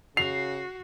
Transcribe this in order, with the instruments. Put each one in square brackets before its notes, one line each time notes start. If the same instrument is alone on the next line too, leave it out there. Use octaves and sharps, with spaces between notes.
[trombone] C#3 [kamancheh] F#4 [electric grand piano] C7 [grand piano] F7